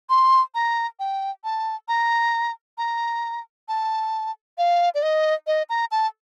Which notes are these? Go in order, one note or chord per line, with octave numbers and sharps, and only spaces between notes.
C6
A#5
G5
A5
A#5
A#5
A5
F5
D5
D#5
D#5
A#5
A5